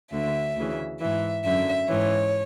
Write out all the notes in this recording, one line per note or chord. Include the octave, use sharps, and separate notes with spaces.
D2 D3 E5
D2 C#3 E3
G#2 E3 E5
F#2 D3 E5
G#2 E3 C#5